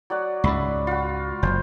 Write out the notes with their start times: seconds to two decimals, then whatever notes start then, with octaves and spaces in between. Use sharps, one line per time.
0.10 F#3 D5 F#5
0.44 C#2 G#2 D5 E5 B5
0.87 F4 F#4
1.43 F#1 C5